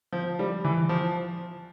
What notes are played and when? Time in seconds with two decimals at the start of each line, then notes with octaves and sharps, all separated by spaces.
0.12 F3
0.39 G3
0.64 E3
0.89 F3